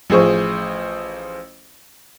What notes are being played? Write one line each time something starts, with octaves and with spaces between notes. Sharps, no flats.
A1 F3 G#4 C5 C#6